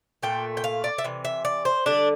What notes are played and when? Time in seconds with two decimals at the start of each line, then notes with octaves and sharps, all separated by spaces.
0.23 A#2 A3 G5
0.57 G5
0.64 F5
0.84 D5
0.98 E5
1.04 C3 E3
1.25 E5
1.45 D5
1.65 C5
1.86 D3 G3 D4